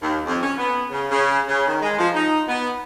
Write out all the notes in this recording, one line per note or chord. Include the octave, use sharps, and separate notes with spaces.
D#2
F2
C#4
B3
C#3
C#3
C#3
D#3
G#3
F3
D#4
B3